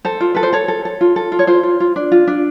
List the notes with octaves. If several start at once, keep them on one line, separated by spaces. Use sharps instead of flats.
A4 C5
F4
A4 B4
C5
A4 C#5
A4
A4
F4
A4
F4
C#5
F4 C5
F4
F4
D4
F4
D4